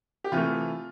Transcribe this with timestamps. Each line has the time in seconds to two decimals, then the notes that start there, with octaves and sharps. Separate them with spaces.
0.24 G4
0.32 C3 E3 A3 F4